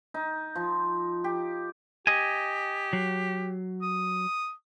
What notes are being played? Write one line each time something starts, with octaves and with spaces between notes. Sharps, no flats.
D#4
F3
G4
G4 D#5 G#5
F#3
D#6